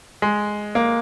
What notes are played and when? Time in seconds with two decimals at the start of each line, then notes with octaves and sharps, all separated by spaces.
0.22 G#3
0.75 A#3